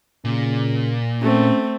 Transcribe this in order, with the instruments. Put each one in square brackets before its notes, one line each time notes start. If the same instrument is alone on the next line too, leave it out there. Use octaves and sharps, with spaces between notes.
[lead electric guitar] A#2 [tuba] C#3
[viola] A3 C4 [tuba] C#4